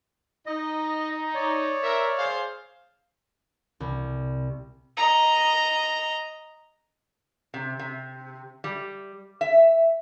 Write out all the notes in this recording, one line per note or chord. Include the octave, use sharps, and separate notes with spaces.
D#4 D#5
C#5 D5
A#4 E5
G#4 C5 F5
C2
D#5 A#5
C3
C3
G3
E5